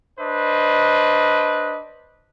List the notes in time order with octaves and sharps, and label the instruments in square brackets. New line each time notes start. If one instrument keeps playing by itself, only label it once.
[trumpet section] D4 B4 C5 D#5